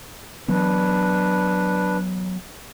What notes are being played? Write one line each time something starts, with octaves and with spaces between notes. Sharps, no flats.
E3 F#3 B3 D4 B4